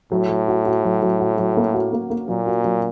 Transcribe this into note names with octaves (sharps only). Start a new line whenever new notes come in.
A2 F#3
F#3
F#4
F#4
F#3
F#3
F#4
F#3
A#3
F#4
A#3
A#3
A#2 F#3
F#4
F#3